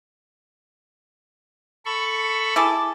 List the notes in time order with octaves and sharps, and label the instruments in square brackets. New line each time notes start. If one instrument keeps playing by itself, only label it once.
[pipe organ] A4 B5 C#6
[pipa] E4 G#4 A4 [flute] D6